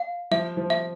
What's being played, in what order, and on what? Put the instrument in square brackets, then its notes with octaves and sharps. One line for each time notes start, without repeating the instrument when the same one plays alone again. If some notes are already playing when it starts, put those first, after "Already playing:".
Already playing: [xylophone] F5
[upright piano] F3 [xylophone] E5
[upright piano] F3
[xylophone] E5